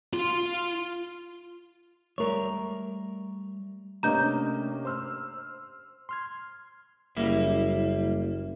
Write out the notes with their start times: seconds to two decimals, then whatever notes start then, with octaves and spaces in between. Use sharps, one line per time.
0.13 F4 C6
2.18 G3 A3 A#4 C#5
4.03 C3 A3 A#3 C#4 D4 D#5 A#5 G6
4.85 C5 C6 E6 F6
6.09 C6 F6 G#6
7.17 F#1 G3 A#3 E4